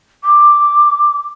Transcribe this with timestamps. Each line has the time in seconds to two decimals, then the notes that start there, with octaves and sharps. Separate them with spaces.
0.24 D6